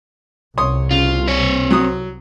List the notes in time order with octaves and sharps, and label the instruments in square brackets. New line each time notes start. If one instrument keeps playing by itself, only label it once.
[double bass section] C2 [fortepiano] C#5 C6 D#6
[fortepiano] C#3 [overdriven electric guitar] F4
[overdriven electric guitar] C4 C#5
[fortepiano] F#3 D#6